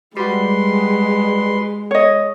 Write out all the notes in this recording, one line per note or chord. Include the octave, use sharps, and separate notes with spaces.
G3 G#3 F#4 B4 C6
C#5 D#5